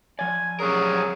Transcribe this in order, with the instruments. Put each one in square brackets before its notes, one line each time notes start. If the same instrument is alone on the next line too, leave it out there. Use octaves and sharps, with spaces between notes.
[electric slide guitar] F3 D5 [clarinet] G#5
[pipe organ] F#3 C#4 [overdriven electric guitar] G3 A#4 [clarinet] G#4